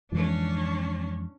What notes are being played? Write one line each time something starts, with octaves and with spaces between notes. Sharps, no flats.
F2 G#2 E3 C#4 D4